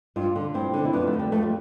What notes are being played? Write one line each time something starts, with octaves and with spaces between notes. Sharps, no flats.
G2 D4 F4
D3
G2 C4 E4
D3
E4
F2 B3 D4
A3
D3
G3
F2 A3
G3